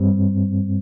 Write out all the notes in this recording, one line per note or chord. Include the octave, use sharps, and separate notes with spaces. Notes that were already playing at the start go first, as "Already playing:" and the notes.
Already playing: G2 G3 C4